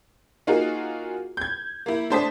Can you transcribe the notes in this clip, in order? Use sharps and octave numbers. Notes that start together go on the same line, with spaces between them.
A#3 D#4 F4 F#4 G#4 A#4
G6 G#6
A#3 E4
A3 D4 C5 A5 D#6 B6